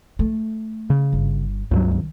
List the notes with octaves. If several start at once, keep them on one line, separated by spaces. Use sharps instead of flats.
A3
C#3
G1
C#2 G2 F#3
C2 D#3